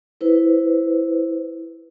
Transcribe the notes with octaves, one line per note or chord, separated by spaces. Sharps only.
E4 B4 C5